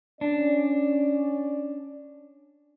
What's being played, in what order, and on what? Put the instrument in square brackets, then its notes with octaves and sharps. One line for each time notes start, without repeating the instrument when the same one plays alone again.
[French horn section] C#4 D5 [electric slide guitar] D4